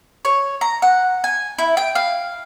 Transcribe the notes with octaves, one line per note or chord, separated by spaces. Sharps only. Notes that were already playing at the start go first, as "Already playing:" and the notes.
C#5
A#5
F#5
G#5
E4
G5
F5